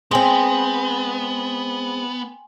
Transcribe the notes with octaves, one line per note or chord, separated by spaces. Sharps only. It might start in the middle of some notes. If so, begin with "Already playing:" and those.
G#3 B3 C4 G5 G#5 C6